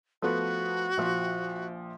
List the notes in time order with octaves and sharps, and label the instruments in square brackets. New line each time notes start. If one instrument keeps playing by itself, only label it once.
[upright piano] F3 A3 B3 [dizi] F#4
[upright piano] A#1 F3